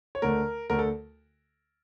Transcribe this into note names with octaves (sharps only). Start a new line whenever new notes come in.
C#5
D2 D3 A3 A#4
D2 D3 A3 A#4
A4